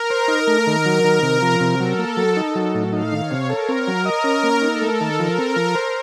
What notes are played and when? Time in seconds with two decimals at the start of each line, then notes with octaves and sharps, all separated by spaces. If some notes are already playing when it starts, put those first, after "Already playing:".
Already playing: A#4
0.10 C5
0.28 D#4
0.47 A3
0.67 D#3
0.85 F#3
1.04 D#3
1.22 C3
1.42 F3
1.60 C3
1.79 F#3 A4
1.99 A#3
2.17 F#3
2.37 D#4
2.55 F#3
2.74 A2
2.92 D#4 F5
3.12 D#3
3.21 C#5
3.31 C3
3.49 A4 A#4
3.69 C4
3.87 F#3
4.05 A#4 D#5
4.24 C#4
4.43 A#3
4.62 D#4 A4
4.82 A3
4.91 A4
5.01 D#3
5.19 F3 A#4
5.38 C4
5.56 F3
5.75 C5